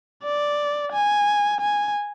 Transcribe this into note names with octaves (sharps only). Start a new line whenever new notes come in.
D5
G#5
G#5